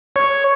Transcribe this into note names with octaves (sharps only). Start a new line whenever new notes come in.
C#5